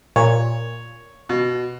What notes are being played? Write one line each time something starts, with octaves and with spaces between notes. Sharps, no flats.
A#2 C#5
B2